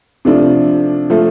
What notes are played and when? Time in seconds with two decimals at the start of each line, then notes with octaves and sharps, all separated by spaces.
0.25 C3 F3 A3 D4
1.10 F3 A3